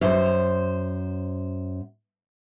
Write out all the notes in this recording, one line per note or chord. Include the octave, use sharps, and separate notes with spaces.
F#2 C5